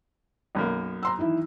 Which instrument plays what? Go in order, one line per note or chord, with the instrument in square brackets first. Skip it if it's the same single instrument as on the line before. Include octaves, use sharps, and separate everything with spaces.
[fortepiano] B1 F#2 A#3
[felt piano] A#5 C6 E6
D#3 E3 E4